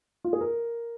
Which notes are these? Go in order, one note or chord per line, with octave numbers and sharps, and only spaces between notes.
F4
G#4
A#4